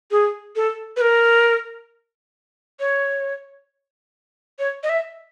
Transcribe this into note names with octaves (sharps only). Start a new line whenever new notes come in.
G#4
A4
B4
A#4
C#5
C#5
D#5
E5